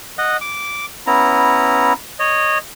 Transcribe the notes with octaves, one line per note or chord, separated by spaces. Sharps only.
D#5 F#5
D6
B3 C#4 E4 A#5
C#5 D#5